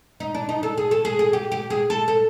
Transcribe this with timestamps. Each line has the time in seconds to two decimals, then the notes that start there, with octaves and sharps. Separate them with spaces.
0.20 D#4
0.35 D4
0.49 D#4
0.63 A4
0.78 G#4
0.91 A4
1.05 G#4
1.19 G#4
1.33 G4
1.52 G4
1.70 G#4
1.90 A4
2.08 A4